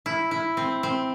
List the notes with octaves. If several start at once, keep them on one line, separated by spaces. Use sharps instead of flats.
E4
E4
C4
C4